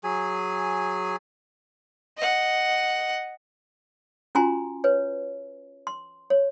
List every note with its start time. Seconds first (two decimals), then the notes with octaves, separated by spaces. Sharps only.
0.04 F#3 G#4 G#5
2.17 D#5 F#5
4.35 C#4 F4 F#4 G#5 A#5 C6
4.84 B4 C#5
5.87 C6
6.30 C#5